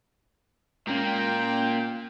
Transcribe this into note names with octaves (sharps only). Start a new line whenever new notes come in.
A#2 G#3 A#3 C#4 G5